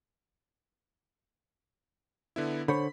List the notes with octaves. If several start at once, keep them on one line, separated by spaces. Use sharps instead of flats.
D3 B3 E4
D3 C5 C#5 B5